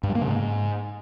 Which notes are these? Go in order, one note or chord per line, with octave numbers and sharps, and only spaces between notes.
G2
G3
A#3
C#3
G#2